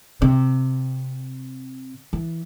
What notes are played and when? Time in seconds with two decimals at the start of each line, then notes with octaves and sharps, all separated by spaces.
0.22 C3
2.13 E3